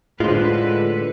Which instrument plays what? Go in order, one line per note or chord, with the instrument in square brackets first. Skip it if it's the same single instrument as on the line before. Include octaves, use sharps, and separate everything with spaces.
[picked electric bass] A2 [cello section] D3 B4 [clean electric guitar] G#3 [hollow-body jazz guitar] F4 C5